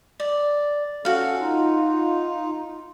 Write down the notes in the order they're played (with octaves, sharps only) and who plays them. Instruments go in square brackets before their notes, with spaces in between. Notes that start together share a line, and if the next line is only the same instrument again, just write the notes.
[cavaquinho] D5
[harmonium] C#4 A4 [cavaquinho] F#4 F5
[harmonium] D#4 F4